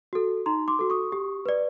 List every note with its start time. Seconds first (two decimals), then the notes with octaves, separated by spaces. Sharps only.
0.13 F#4 A4
0.46 D#4 A#5 C6
0.68 C6 D6
0.79 F#4 A4
0.90 C#6 D#6
1.12 G4
1.46 B4 D5